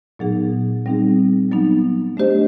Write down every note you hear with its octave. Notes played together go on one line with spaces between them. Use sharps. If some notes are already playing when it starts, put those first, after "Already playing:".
A#2 F#3 B3 D#4 G#4
G3 C4 D#4 G#4
F#3 B3 D#4
A3 D4 G4 C5 D#5